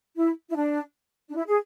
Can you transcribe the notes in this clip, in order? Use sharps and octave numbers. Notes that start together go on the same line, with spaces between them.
E4
E4
D4
D4
E4
G#4